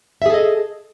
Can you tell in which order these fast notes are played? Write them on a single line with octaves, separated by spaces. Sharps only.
E5 G#4 A4 D#5